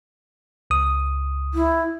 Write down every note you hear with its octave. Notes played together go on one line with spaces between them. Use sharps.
C#2 D#6
E4